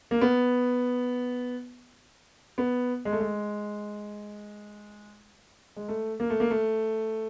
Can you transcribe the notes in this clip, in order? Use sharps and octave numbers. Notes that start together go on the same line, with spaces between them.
A#3
B3
B3
G#3
A3
G#3
G#3
A3
A#3
A3
A#3
A3